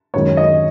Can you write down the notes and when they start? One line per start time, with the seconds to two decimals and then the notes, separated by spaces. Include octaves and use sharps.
0.14 F#2 D#3 G#3 C#5
0.37 D#5